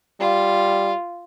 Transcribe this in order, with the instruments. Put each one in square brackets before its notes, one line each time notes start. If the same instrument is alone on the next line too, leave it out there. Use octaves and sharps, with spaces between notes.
[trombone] G3 [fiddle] F4